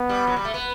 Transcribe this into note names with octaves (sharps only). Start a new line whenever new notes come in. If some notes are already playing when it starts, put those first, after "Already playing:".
Already playing: B3
G3
F#3
G3
A3
B3